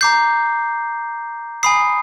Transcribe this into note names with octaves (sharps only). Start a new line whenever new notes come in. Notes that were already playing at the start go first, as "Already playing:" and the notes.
A#5 D6 G6 C7
G#5 B5 D#6 C7